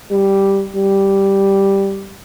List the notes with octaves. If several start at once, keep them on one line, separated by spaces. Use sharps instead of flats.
G3
G3